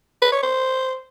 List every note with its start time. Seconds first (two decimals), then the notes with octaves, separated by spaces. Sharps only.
0.22 B4
0.32 C#5
0.43 C5